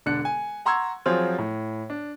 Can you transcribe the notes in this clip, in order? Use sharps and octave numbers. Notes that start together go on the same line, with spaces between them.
E1 D3 D4 F#6 C#7
G#5
F#5 A#5 C6 C#6 E6 G#6
F3 F#3 C4 F4 G#4
A2
D4